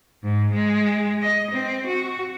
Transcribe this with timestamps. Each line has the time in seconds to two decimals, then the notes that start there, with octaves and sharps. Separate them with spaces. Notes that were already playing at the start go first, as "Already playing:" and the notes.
0.23 G#2
0.53 G#3
1.21 D#5
1.52 C4
1.87 F#4